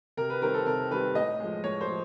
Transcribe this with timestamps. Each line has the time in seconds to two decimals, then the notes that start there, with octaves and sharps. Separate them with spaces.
0.17 C3 A#4
0.30 B4
0.41 D#3 G3 C4 A#4
0.54 A4
0.66 C3 A#4
0.91 D#3 G3 C4 B4
1.15 A2 D#5
1.40 F3 G#3
1.64 A2 C#5
1.81 C5
1.89 F3